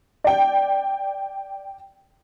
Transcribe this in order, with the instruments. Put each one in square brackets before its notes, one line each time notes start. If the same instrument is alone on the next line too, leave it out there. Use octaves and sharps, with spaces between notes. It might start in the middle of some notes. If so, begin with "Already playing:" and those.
[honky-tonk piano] D5 G5